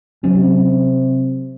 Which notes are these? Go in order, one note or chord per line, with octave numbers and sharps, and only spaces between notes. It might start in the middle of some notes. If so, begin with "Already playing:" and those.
C3 F#3 C#4